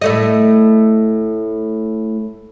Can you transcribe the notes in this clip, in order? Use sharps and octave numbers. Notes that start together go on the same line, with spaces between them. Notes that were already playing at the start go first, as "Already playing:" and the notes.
A2 A3 D#5